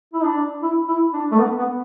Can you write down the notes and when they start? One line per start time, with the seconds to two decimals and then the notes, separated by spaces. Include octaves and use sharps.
0.13 E4
0.24 D4
0.62 E4
0.88 E4
1.14 D4
1.31 A3
1.39 B3
1.59 B3